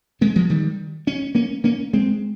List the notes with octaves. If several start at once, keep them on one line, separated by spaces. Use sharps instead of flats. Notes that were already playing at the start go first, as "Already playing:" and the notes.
G#3 C4
F3 G#3
D#3 G3
C#4
A#3 C#4
A#3 C#4
G#3 C4